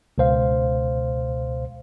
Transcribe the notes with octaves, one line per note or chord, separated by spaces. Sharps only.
C#2 B2 C5 F5